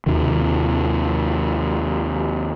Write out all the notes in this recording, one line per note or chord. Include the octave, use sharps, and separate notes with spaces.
D#2 C3 D#3